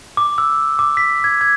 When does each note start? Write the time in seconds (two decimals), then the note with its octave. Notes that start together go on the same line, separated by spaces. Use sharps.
0.17 D6
0.38 E6
0.79 D6
0.97 B6
1.24 G#6
1.41 G#6